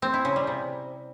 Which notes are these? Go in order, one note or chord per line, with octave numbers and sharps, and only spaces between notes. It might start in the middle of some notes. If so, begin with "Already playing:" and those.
C4
E4
C#3
G3
C3